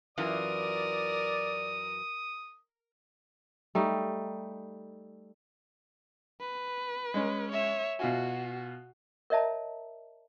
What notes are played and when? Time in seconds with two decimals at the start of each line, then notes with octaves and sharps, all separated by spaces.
0.17 F#2 E3 F4 A#4 D5 D#6
3.75 G3 A3 D#4
6.40 B4
7.14 G#3 C#4
7.52 C#5 E5
7.99 B2 F4 F#4 G#5
9.30 A#4 C#5 D#5 E5 A5 A#5